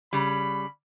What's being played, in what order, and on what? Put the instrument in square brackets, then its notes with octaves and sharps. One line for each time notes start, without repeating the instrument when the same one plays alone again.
[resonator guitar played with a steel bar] C#3 G3 [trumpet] B5